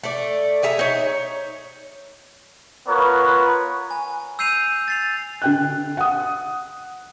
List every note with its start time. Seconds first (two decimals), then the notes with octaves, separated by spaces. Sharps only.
0.04 A3 D5
0.63 G#4 E5 A#5
0.79 D#4 C#5
2.88 B3 F4 A#4 B4 C#5
3.91 G#5
4.39 E6 G6 C7 D#7 F7
4.88 A6 C7 F7
5.42 D3 G5 F#6
5.97 F#5 D#6